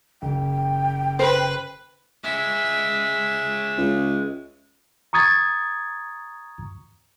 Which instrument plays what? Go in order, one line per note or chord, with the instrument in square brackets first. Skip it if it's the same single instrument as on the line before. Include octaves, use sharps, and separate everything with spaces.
[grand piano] F#1 [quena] G5
[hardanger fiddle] B4 [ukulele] C5
[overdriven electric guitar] G#3 C#4 [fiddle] E5
[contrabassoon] C#2
[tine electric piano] A#5 C#6 D#6 G#6 A6